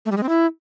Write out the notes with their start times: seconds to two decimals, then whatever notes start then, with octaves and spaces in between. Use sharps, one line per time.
0.06 A3
0.11 G3
0.17 G#3
0.23 C4
0.29 E4